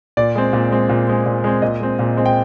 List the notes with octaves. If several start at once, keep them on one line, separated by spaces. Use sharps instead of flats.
A#2 D5
G#3 C4
A#2
G#3 C4
A#2
G#3 C4
A#2
G#3 C4
A#2 D#5
G#3 C4
A#2
G#3 C4
G5